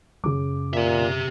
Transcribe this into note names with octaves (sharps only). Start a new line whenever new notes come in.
F#2 C#3 D6
A#2 G4 E5